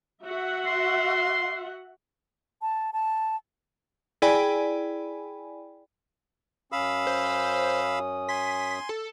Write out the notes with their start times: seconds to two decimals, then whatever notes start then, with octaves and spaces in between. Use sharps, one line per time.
0.23 F#4 E5 F#5
0.67 C6
2.62 A5
2.93 A5
4.22 E4 G#4 D5 G5 G#5 B5
6.72 F#2 C#4 F5 B5 D#6 E6
7.07 C5
8.29 G#5 C6 B6
8.89 A4